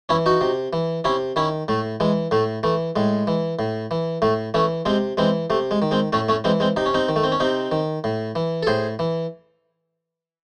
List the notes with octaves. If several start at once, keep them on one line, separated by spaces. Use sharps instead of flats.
E3 C#4 E4
D#4 F#4
C3
E3
C3 C#4 E4
D#3 C#4 E4
A2 A3
E3 G#3
A2 A3
E3 A3
A2 G#3
E3
A2
E3
A2 A3
E3 A3 C#4
C3 G#3 C4
E3 G#3 C4
C3 A3
G#3
D#3
G#3 C4
A2 A3 C#4
A3 C#4
E3 G#3 C4
G#3 C4
C3 D#4
C#4
C4 D#4
D#3
A3
C4
C#4
C3 C4 D#4
D#3
A2
E3
A4
A2 G#4 C5
E3